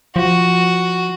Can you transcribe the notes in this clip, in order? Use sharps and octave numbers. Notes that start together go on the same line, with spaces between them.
F3 F#4